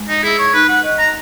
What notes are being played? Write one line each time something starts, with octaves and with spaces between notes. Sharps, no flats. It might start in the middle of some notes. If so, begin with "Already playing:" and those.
Already playing: G#3
D#4
E4 G#4
C#5
D#4 B4
F#5
D#5
A#5